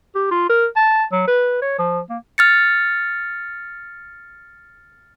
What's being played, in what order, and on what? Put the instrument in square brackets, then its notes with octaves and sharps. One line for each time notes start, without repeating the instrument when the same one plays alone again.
[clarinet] G4
F4
A#4
A5
F#3
B4
C#5
F3
A#3
[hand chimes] F6 A6 C#7